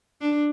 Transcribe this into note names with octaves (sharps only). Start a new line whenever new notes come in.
D4